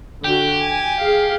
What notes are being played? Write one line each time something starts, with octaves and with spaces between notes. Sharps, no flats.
D3 F#4 G4
G#5
G#4 F5